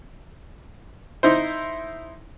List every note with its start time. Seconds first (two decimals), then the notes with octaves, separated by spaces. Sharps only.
1.23 D#4 E4 C5